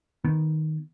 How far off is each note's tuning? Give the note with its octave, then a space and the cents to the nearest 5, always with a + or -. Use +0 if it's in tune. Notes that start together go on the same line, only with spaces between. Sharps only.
D#3 +0 B3 +0